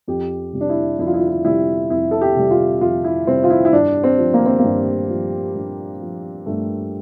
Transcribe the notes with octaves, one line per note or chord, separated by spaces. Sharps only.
F2 G4
C3 G3
D4
E4
F2 E4
F4
E4
F4
E4
C3 G3 E4
F2 E4
A4
G4
C3 G3
F4
F2 F4
E4
C3 G3 C4
F4
E4
E4
G2 D4
C4
F3
A#3
C4
A#3
G2
F3
G2
F3
G2 A3